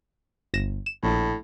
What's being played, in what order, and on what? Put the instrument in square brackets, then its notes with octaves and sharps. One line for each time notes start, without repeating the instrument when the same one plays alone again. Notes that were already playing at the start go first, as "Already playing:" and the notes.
[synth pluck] G1 A#6 E7
E7
[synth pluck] A#1 [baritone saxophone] A2